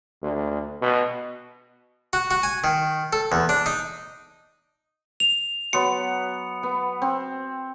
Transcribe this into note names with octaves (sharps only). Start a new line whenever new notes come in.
D2
B2
F#4
F#4
G#5
D#3
A4
E2
D4
D#4
F7
F#3 B3 C6 C#7
B3
C4